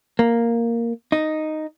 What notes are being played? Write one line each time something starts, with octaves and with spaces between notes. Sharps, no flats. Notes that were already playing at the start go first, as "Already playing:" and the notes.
A#3
D#4